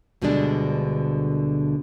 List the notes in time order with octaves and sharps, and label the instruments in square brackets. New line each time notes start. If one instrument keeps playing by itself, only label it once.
[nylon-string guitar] D2 B2 D3 G3 G#3 D4